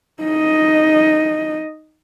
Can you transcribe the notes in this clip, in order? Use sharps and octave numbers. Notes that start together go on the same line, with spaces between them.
D#4 D#5